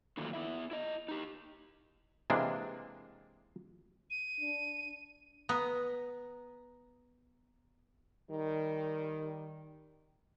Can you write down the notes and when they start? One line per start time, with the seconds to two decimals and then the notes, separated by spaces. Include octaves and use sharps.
0.17 D3 D#3 F3 F#3 A3 A#3
0.33 B3 E4 E5
0.71 E4 D#5
1.08 D#4 G4
2.30 C3 E3 G#3 A#3 D4
4.11 D#7
4.40 D4
5.49 B3 A#5 D#6
8.30 D#3 G3